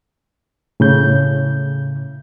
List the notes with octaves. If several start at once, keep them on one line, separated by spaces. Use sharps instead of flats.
A2 C#3 G6